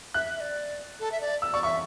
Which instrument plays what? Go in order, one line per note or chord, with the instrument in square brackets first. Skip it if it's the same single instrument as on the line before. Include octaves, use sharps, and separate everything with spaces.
[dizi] E5 [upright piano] F#6
[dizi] E5
D5
A4
E5
D5
[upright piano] E6
[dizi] D5 [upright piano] C#6
[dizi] E5 [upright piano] C#6